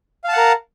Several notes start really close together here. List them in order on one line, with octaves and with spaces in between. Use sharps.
F5 A5 F#5 A#4